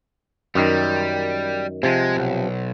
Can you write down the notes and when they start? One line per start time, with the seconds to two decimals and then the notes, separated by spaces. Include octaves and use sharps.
0.55 F#2 D#3 G3
1.83 C3 F3 G#3
2.16 B1